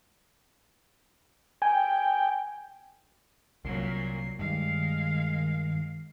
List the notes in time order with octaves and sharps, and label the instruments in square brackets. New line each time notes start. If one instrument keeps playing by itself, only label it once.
[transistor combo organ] G5 [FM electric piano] G#5
[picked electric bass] C2 [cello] A#2 F#3 [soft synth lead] C7
[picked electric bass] G2 [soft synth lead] D#3 [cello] G#3 F5